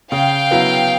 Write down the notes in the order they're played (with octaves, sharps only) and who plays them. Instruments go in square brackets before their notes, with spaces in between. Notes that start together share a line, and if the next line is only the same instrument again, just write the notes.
[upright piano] C#3 [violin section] F5 G5
[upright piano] F#3 B3 E4